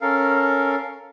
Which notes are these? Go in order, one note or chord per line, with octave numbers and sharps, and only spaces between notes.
C#4 A4 A#4 F5